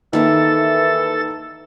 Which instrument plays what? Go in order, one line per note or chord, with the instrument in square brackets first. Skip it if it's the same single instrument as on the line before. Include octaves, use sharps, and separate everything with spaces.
[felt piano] D#3 A#3 [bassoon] E3 [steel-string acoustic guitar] G3 A#4 E5 [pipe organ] A4 A6